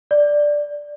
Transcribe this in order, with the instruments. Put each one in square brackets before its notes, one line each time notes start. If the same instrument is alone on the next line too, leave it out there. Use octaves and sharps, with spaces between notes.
[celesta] D5